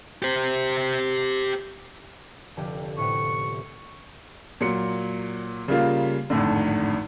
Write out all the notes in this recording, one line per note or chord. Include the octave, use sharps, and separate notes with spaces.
G4 C5
F1 D3 G4
A2 C3 B3 C#6
A#2 F#3 C#7
C#3 G3 A#3 F4
G#1 F2 A2 D3